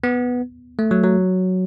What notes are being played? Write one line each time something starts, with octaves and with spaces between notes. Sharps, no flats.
B3
A3
F#3
F#3